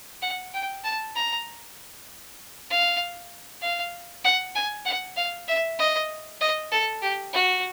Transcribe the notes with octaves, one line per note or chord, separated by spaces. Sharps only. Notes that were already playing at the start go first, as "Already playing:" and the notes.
F#5
G5
A5
A#5
F5
F5
F#5
G#5
F#5
F5
E5
D#5
D#5
A4
G4
F#4